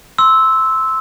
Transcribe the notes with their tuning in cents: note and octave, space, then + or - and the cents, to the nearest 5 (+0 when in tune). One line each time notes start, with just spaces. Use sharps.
C6 +0 E6 -10